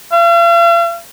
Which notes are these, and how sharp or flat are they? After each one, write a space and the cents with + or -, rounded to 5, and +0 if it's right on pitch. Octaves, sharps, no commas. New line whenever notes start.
F5 -45